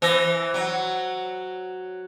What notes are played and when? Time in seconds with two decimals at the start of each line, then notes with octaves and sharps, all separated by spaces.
0.02 E3 C5 E6 A#6
0.54 F#3